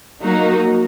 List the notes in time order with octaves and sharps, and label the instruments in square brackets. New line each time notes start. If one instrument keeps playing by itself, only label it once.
[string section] F#3 A#3 D#4 F#4